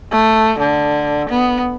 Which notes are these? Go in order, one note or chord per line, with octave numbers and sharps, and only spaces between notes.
A3
D3
B3